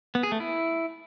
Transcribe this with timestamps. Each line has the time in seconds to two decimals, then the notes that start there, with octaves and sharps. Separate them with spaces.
0.15 B3
0.23 G#4
0.32 A3
0.40 E4